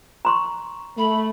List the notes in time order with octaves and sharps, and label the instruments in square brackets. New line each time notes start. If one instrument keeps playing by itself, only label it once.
[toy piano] A#5 C6 C#6
[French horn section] A3 [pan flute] B5